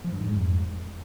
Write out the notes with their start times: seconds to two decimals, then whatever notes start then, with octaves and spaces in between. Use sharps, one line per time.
0.04 F3
0.12 G2
0.20 G#2
0.28 G#3
0.36 F2